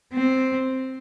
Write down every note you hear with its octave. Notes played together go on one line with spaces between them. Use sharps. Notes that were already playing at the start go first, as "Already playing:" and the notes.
C4